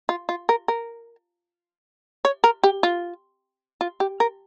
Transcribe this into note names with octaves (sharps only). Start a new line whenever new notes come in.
F4
F4
A#4
A#4
C#5
A#4
G4
F4
F4
G4
A#4